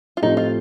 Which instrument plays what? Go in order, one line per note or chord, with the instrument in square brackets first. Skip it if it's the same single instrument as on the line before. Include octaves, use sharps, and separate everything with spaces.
[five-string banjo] F4
[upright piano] A2 F3 A3 C4 G4 [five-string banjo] D#4
[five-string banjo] F4